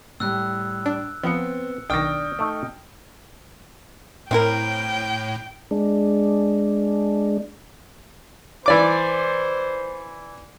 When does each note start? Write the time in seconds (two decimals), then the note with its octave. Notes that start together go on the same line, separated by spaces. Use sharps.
0.20 A2 G3 E6 F#6
0.86 D4
1.23 F3 B3 C4 C#7
1.90 B1 D#3 D4 G5 C#6 D#6 F6 A#6
2.39 A3 D#4
4.31 A2 C4 E4 A#4 G5
5.71 G#3 D4
8.66 E3 C5 D5 D6